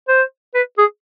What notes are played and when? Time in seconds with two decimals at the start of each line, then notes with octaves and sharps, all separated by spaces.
0.08 C5
0.54 B4
0.78 G#4